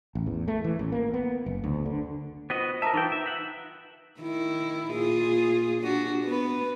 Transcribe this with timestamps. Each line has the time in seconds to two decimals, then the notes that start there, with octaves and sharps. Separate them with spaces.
0.15 A1
0.26 E2
0.48 A3
0.64 E3
0.79 A1
0.92 A#3
1.14 B3
1.46 F#1
1.64 D2
1.85 D3
2.50 B3 F4 F#4 C5 D#5
2.82 A#4 E5 A5 A#5 D#6
2.94 E3 D#4 F4 B4 G5
3.12 E5
3.26 E5 F#5
4.20 D#3 E4
4.93 A#2 F4 G#4
5.82 D4 F#4
6.25 B3 B4